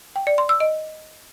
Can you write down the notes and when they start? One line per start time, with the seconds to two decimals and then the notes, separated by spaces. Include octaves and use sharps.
0.16 G5
0.27 D5
0.38 C6
0.49 E6
0.60 D#5